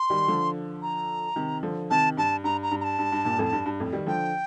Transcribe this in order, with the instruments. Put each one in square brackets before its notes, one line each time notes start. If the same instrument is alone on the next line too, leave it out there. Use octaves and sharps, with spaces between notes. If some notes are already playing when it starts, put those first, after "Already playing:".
Already playing: [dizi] C6
[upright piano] D#3 G3
D3 F3
[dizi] A#5
[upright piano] C3 D#3
D3 F3
[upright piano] C3 D#3 [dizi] A5
[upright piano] G2 [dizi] A5
[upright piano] G2 [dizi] A#5
[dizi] A#5
[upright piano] G2
[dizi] A#5
A5
[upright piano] G2
G2
G2 A#2
F2 A2
G2
G2
F2 A2
D#3 G3
[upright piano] D3 F3 [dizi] G5